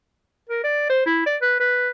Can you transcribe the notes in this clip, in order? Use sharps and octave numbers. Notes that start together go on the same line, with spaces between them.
A#4
D5
C5
E4
D5
B4
B4